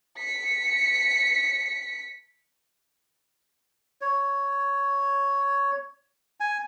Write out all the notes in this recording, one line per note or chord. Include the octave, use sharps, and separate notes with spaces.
B6 C#7
C#5
G#5